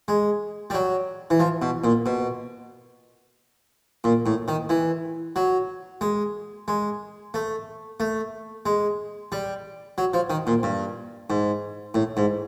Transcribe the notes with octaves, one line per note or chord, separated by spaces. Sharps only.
G#3
G3
F#3
E3
F3
B2
A#2
B2
A#2
A2
D#3
E3
F#3
G#3
G#3
A3
A3
G#3
G3
F#3
F3
D#3
A#2
G2
G#2
A2
G#2